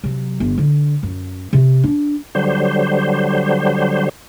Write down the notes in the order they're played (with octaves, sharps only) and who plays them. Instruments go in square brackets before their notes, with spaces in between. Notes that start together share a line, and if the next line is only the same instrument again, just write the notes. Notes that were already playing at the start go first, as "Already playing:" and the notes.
[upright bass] C3 F#3
G1
D3
F#2
C3
D4
[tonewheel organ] D3 F#3 G3 C5